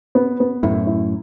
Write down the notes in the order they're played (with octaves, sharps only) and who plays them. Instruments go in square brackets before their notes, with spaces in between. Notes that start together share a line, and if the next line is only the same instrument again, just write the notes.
[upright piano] B3
B3
[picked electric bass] F#2 A2 [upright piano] E4
[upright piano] E4